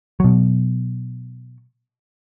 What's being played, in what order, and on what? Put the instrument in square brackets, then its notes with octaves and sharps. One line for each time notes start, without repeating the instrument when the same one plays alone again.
[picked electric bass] B2 F#3